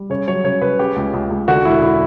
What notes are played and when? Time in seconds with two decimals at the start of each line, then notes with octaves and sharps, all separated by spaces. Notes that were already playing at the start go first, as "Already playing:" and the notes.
Already playing: G3
0.10 C#3 C#5
0.28 F#3 C#5
0.44 C#3 C#5
0.61 C#3 B4
0.79 C#3 G4
0.96 C#2
1.14 C#2
1.31 C#2
1.48 D3 F#4
1.65 E1 E4
1.82 E4